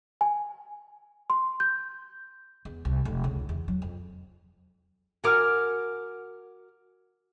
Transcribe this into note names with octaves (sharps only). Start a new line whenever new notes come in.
G#5
C6
G6
E2
C2
F1
C#2
E2
F#3
F2
F#4 A#4 G#5 D6 F6